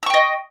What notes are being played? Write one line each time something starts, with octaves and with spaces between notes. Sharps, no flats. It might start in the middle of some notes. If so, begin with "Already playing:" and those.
D#5 G5 C#6 E6